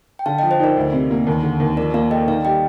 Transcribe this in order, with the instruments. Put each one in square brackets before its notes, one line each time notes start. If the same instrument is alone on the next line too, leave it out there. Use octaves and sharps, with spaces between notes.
[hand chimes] G5
[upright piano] D3 [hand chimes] F5 A5
[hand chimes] D#5 G5
[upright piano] F3
[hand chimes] C5 D#5
[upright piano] D#4 [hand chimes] A#4 D5
[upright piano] D2
C3
A#3
D#2
D3
D#2
[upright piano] F3 [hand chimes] A#4 D5
[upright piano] A#3 [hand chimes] D5 F5
[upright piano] A4 [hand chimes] D#5 G5
[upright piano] D#3 [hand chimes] D5 F5
[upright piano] G3 [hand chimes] D#5 G5